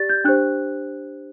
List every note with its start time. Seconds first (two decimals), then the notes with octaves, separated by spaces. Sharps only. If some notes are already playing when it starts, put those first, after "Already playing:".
Already playing: G4 D5 A6
0.09 G6
0.25 D4 G4 C5 F#6